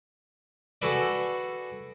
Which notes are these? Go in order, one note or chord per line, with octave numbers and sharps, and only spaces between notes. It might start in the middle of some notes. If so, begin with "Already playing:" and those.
F#4 G#4 A4 B4 D5